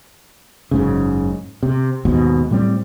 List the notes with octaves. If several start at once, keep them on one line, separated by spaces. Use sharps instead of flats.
F#1 G#2 C#3
C3
D#2 G#2 B2
A2 G3 C4